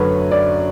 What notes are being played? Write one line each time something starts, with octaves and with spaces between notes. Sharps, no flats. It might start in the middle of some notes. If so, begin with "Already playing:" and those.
Already playing: F#2 D3 F#3 A3 B4 C#5
D5